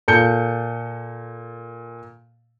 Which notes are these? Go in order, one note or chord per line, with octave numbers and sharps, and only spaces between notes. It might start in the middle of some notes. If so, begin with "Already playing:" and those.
A#2 A4 A5 G6 C#7